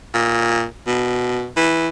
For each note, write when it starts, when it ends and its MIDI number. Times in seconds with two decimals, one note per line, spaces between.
0.14 0.65 46
0.87 1.48 47
1.57 1.89 52